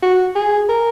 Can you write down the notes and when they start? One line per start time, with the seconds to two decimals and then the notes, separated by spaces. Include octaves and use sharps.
0.02 F#4
0.35 G#4
0.69 A#4